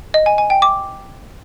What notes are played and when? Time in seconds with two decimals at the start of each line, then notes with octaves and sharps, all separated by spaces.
0.14 D#5
0.26 G#5
0.38 G#5
0.50 G5
0.62 D6